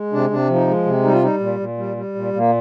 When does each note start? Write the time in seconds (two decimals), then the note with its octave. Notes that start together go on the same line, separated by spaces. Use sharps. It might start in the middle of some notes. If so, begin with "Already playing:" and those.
Already playing: G#3
0.12 C3 D4
0.30 C3 D4
0.49 F3
0.55 D#4
0.68 G#3
0.85 C3
1.03 G3 D#4
1.13 F4
1.23 G3 D#4
1.40 A#2
1.60 A#2
1.78 G3
1.97 G3
2.15 A#2
2.33 A#2 A#3